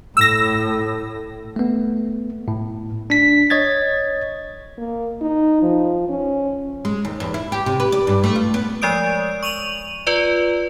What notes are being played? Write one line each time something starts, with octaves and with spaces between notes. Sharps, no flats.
A2 E6 A#6
A3 B3
A2
D4 B6
C#5 D#5 G#6 A6
A#3
D#4
F3
C#4
G#3
D#2
E2
E4
G4
C3
B4
D5
G2
A3
F4
B3
F3 G#3 D5 D#6 D7
C#6 D#7 F7 F#7
F4 B4 D5